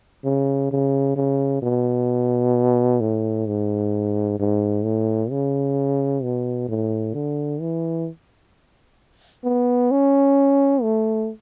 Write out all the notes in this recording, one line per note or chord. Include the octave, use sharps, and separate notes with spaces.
C#3
C#3
C#3
B2
A2
G#2
G#2
A2
C#3
B2
A2
D3
E3
B3
C#4
A3